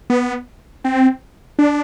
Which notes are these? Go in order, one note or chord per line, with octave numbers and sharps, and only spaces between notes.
B3
C4
D4